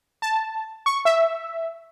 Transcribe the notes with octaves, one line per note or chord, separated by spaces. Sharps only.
A5
C#6
E5